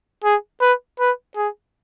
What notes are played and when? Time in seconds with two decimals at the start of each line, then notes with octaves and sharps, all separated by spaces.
0.24 G#4
0.61 B4
1.00 B4
1.36 G#4